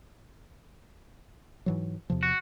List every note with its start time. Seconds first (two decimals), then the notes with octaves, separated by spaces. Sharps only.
1.66 G#2 E3 F#3
2.10 E2 C3 F3
2.23 F#4